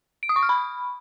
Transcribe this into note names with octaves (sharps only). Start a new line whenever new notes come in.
D7
D#6
C#6
F6
B5